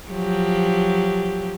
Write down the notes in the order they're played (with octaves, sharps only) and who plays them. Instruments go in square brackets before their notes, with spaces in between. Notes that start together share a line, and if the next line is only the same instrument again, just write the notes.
[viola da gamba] F3 F#3 G4